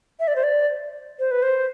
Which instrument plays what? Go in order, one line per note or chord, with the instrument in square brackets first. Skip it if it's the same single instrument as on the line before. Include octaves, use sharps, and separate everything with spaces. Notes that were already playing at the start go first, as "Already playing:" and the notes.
[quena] E5
D5
C5
D5
C5
B4
C5